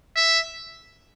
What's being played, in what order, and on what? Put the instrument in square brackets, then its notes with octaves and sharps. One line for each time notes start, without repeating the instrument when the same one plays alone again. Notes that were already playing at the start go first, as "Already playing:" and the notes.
[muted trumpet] E5